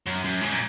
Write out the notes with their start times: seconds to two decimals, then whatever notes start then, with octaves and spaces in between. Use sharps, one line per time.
0.06 F#2
0.24 F#2
0.41 G#2
0.52 A#2